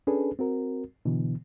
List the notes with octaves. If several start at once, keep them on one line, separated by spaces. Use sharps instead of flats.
C#4 D4 G#4 A4 B4
C4 F#4 A#4
B2 D3 E3 B3